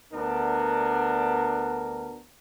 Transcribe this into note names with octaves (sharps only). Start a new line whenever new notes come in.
D2 B3 D4 A#4